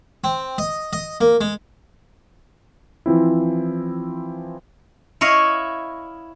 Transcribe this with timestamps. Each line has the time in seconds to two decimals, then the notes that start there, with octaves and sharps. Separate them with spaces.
0.24 C4
0.58 D#5
0.93 D#5
1.21 A#3
1.41 G#3
3.06 E3 F3 C4 E4
5.21 E4 C#5 D#5 F5